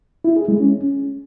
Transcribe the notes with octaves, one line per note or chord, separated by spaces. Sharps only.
E4
G#4
G#3
C#4